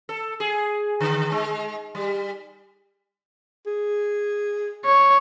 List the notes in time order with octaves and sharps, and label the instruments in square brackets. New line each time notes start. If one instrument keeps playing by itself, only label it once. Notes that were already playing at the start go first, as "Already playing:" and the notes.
[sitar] A4
G#4
D3
G#3
G3
[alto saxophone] G#4
[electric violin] C#5